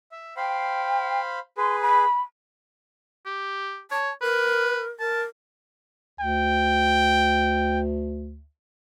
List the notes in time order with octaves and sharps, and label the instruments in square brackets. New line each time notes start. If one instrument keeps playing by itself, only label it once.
[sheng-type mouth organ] E5
[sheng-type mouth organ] C5 F5 B5 [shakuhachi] G5
[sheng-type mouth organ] G#4 B4 [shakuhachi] C6
[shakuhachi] B5
[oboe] G4
[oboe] C#5 [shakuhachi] A5
[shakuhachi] A#4 [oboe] B4
[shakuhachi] A#4 [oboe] A5
[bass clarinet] D2 [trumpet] G5